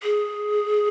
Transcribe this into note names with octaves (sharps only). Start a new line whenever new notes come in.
G#4